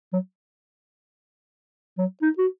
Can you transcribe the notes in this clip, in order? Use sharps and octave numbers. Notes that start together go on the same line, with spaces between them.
F#3
F#3
D#4
F#4